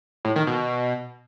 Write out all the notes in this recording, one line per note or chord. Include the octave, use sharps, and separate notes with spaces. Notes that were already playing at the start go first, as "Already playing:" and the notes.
A2
D#3
B2